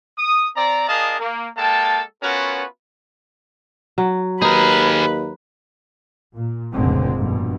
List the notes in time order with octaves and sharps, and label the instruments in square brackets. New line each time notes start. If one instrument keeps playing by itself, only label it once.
[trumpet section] D#6
C4 D5 A#5
D4 G#4 A#4 D#5 F5 A5
A#3
G#3 A#3 A4 G5 A5
B3 C#4 F4 F#4 A#4 B4
[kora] F#3
[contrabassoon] D#2 [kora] D#4 [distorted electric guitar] G#4 A#4 [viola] B4
[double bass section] A#2
F1 C#2 A#2 D3 G#3 C4
A#1 G2 B2